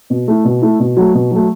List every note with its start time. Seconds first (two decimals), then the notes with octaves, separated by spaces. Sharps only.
0.10 B2
0.28 A3 E4
0.45 B2
0.62 A3 E4
0.80 B2
0.97 F#3 A3
1.14 B2
1.31 F#3 A3